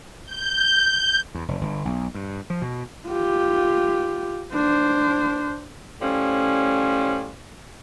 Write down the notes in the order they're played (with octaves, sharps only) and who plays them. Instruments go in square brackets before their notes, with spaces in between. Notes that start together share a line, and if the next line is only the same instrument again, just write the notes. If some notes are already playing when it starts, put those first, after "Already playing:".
[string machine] G6
[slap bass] E2
F1
G1
B1
G2
F3
B2
[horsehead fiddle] F4 G4
D4 C5
[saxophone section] A2 F3 G3 C#4